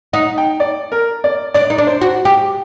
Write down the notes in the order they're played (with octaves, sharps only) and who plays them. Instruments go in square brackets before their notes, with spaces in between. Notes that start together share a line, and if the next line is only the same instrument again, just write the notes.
[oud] D#4 [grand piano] F#5
[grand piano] G5
D5
A#4
D5
[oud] D4 [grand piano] D5
[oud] D#4
D4
[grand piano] C5
[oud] F#4
G4